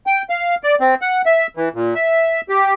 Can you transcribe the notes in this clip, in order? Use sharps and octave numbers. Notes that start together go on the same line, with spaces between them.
G5
F5
D5
C4
F#5
E5
E3
A#2
E5
G4